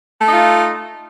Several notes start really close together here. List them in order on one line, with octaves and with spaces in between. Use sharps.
A3 D#4 F4